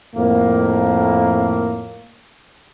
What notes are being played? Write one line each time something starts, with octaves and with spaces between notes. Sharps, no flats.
F2 A2 A#3